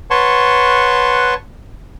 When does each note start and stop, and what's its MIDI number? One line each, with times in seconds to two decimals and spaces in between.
0.10 1.34 71
0.10 1.34 73
0.10 1.34 78
0.10 1.34 81
0.10 1.34 84
0.10 1.34 85